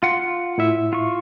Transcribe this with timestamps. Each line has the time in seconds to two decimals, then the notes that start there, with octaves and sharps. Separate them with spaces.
0.03 F4 F5 F#5 C6
0.58 A2 E4 E5
0.93 F4 C#6